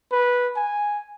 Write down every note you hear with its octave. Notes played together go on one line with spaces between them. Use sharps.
B4
G#5